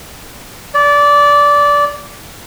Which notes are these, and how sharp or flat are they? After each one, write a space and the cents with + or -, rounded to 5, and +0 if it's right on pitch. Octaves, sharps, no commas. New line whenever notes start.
D5 -20